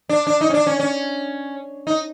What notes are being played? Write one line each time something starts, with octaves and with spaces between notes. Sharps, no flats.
D4
D4
D#4
C#4
D4
C#4
C#4
D#4